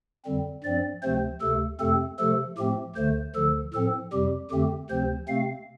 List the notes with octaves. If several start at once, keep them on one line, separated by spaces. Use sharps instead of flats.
F2 D3 G3 C4
G2 F3 C4 D5
D2 C3 F3 A3 C4 C5
D2 C3 A3 A4
F2 C3 A3 C4 A4
C3 F3 A3 A4
A2 F3 A3 C4 G4
D2 D3 A3 C5
D2 D3 F3 A4
A2 F3 C4 A4
F2 C3 G3 G4
F2 D3 A3 C4 G4
D2 C3 F3 C4 C5
C3 A3 C4 F5